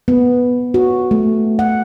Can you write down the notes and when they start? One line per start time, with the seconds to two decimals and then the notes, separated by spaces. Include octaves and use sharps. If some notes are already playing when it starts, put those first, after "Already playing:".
0.08 B3
0.74 F#4
1.11 A3
1.59 F#5